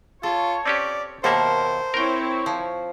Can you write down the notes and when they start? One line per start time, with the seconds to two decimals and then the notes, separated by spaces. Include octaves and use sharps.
0.23 F4 A4 C#5
0.66 C4 C#4 G4 D5
1.24 D#2 B2 A#3 A4 A#4 C5 E5
1.94 C4 E4 A#4 C#5 G5
2.46 F3